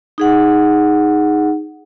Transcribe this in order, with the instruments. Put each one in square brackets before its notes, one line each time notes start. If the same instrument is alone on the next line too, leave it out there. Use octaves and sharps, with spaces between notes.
[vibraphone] D#4 G#4 F#5